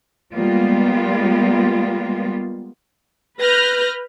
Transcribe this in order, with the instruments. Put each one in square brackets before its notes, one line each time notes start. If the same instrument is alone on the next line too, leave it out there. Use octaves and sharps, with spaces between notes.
[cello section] G3 G#3 A#3 B3 F4
[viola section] B4 [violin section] F6 G6 A#6